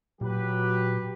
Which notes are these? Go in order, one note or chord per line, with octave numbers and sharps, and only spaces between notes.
A#2 F#3 G4 B4